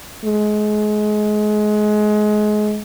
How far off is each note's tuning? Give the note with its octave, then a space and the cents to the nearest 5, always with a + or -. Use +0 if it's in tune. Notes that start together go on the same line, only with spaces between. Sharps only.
G#3 +25